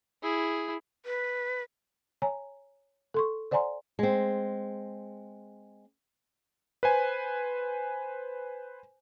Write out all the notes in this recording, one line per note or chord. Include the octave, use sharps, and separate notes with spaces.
E4 G#4
B4
C#5 G#5 A#5
A4 C6 C#6
C5 D5 F#5 G#5 A#5 C6
G#3 C4
B4 C5 G#5